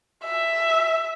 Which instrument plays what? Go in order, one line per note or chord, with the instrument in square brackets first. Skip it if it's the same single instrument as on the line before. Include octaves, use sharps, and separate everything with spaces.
[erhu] E5